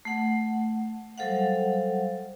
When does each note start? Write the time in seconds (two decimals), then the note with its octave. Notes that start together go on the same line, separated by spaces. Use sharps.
0.05 A3 F#5
1.18 F#3 G3 A4 C5 F5 F#5